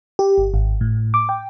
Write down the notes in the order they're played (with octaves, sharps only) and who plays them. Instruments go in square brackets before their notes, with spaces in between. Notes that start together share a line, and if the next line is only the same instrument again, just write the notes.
[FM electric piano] G4
G1
G#1
A2
D6
G5